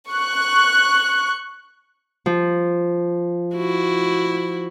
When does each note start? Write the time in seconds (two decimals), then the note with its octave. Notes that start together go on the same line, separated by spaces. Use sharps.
0.11 C#6 F#6
2.26 F3
3.55 E4 F#4